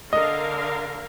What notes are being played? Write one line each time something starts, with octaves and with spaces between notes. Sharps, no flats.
D3 A#4 D#5 F5